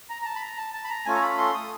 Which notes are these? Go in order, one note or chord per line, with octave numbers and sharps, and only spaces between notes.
A#5
A#5
A5
B5
A#5
A5
A5
B5
A#5
A3 C#4 F4 A4 G#5
A#5
B5
C6
D#6